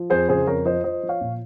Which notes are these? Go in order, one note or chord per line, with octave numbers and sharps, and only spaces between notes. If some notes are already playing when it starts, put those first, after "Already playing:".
Already playing: F3
F2 G#4 C5
C#3 G#4 C5
F2 A#4 C#5
F3 C5 D#5
F3 C5 D#5
F3
C#5 F5
A#2